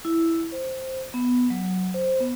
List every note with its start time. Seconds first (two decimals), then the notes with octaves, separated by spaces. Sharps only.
0.05 E4
0.52 C5
1.14 B3
1.50 F#3
1.94 C5
2.20 B3